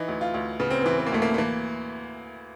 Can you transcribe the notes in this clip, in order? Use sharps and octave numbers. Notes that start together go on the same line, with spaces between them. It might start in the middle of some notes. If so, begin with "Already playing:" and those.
Already playing: E3 D#4
D2
F4
D2
C#3 B3
C4
E3 B3
B3
A#3
D2 A3
A#3
A3
E3 A#3